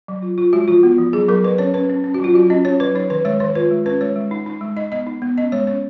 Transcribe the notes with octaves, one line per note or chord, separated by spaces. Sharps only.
F#3
F4
F4
G#3 F#4
F3 F4
B3 F#4
F3
F#3 G#4
F#3 A#4
F#3 B4
C#4 C#5
C#4 B4
C#4
C#4
F#4
F#3 F4
F#3 F#4
C#4 D#5
C#4 C#5
F#3 B4
D#4 C#5
D#3 B4
G#3 C#5
D#3 C#5
F4 B4
G#3
C#4 B4
G#3 C#5
G#3
D#4
D#4
G#3
D#4 D#5
B3 D#5
D#4
B3
C#4 D#5
G#3 C#5
C#4 C#5